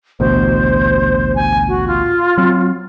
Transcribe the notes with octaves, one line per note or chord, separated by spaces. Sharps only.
A1 D2 B2 C5
G#5
F#4
F4
F#3 C4